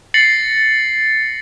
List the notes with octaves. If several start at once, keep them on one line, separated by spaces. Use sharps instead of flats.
A6 A#6 C7 C#7 F#7